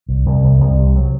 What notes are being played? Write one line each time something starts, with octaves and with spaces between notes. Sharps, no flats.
C2
C2
C2
C2
C3
F#3